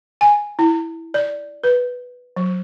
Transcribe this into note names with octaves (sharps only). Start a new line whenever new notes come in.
G#5
E4
D5
B4
F#3